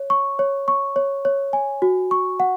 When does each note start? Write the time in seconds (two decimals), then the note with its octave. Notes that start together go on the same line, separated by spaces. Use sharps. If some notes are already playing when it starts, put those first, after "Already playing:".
Already playing: C#5
0.10 C#6
0.39 C#5
0.68 C#6
0.96 C#5
1.25 C#5
1.53 G#5
1.82 F#4
2.11 C#6
2.40 F#5